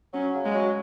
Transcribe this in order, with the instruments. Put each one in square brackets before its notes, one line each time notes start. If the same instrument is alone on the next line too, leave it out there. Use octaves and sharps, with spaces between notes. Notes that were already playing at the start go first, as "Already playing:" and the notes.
[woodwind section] F#3 [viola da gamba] C#4
[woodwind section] C#3
[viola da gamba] G#3
[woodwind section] F#3